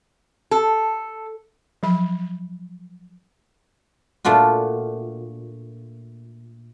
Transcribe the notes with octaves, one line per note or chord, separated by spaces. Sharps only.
A4
F3 F#3 B5
A#2 A3 D4 F4 F#4